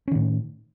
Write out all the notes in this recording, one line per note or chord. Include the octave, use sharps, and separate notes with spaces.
A2 D#3 C#4